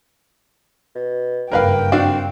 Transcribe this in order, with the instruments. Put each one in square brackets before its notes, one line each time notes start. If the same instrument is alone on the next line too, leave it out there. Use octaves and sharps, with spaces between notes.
[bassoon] B2
[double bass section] F#1 G2 [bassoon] A#3 [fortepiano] A#4 B4 F5 [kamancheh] G5
[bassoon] C4 [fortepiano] D4 F#4 F5